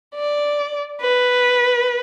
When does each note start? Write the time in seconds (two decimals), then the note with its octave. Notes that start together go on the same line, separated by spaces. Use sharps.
0.15 D5
1.01 B4